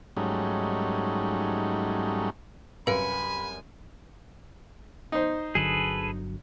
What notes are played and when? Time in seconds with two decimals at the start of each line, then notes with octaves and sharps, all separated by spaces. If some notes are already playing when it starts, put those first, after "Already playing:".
0.17 G#2 F#3 G3 A3 C#4 D#4
2.87 C2 F#2 B4 F5 G#5 B5 C#7 D7
5.12 D#4 C5
5.55 G1 D3 F#3 G#4 A4 B4